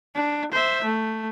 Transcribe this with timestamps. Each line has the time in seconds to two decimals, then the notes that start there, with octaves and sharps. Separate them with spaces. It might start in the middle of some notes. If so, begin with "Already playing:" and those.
0.15 D4
0.52 C5 E5
0.84 A3